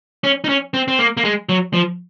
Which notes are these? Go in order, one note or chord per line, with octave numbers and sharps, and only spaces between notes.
C#4
D#4
C#4
C4
C4
A#3
A#3
G#3
F#3
F3